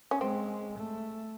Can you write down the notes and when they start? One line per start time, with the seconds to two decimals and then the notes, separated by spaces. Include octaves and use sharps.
0.11 C#4
0.21 G#3 C4
0.77 A3